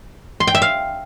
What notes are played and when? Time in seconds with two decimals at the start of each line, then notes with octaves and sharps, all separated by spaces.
0.40 C6
0.47 G5
0.55 E5
0.62 F5